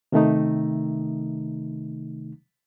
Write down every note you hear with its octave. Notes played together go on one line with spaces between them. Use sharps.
C3 D#3 A3 D#4